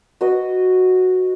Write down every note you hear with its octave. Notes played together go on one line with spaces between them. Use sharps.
F#4 B4 D#5